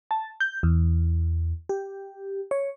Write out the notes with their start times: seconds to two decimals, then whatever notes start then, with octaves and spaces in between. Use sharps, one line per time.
0.11 A5
0.40 G6
0.63 E2
1.69 G4
2.51 C#5